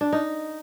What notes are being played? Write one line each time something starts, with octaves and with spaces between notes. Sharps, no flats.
D4
D#4